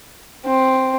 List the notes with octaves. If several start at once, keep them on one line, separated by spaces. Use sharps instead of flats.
C4